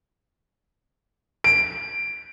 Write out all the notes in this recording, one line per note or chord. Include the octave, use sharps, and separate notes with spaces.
D7